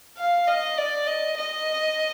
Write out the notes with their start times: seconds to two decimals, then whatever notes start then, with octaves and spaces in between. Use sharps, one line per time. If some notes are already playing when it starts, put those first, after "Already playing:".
0.18 F5
0.48 D#5
0.78 D5
1.07 D#5
1.38 D#5